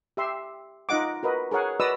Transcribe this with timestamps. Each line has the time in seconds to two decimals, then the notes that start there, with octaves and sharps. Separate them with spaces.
0.17 G4 E5 C6
0.89 D#4 F4 D#5 F#5 D6
1.23 F#4 A#4 B4 D#5
1.51 G#4 A#4 C#5 F#5 G#5
1.80 F#4 B4 D5 D#5 D#6 E6